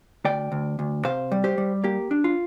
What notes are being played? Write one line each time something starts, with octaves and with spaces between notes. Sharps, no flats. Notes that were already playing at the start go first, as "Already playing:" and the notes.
D2 D5 G5
D2
D2
C3 C5 F5
G3
G4 C5
G3
A#3 G4
D4
F4